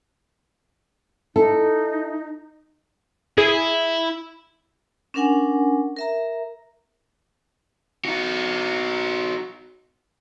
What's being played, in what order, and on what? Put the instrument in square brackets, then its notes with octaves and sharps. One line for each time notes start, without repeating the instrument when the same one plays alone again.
[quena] D#4 [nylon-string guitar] E4 A4
[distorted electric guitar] E4 [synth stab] G#4
[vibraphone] C#4 D4 A#4 F#5 G#5
A#4 E5 A#5
[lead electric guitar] D#4 F#4